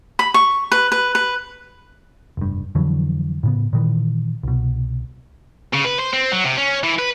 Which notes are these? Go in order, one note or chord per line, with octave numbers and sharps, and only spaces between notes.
B5
C#6
B4
B4
B4
F1 G2
F2 D3 E3 F#3
A2 C#3 B3
A#2 D#3 E3
C2 B2
C#3
B4
C5
C4
F#3
C3
C#4
E3
B4